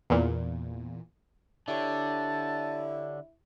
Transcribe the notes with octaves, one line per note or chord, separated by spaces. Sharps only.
E2 A#2
D3 D4 E4 G4 C#5 A5